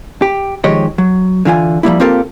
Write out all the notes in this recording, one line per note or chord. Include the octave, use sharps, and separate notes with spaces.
G4
D#3 F3 G#3 G4 C#5 D#5
F#3
D3 E3 F4 D#5 G#5
F3 G3 A#3 E4
A#3 C4 F4 G4 A4 A#4